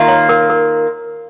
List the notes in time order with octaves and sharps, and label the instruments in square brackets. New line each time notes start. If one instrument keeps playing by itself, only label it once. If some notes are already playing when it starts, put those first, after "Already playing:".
Already playing: [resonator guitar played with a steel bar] D#3 A#3 F4
[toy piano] C#5
A#4
A#4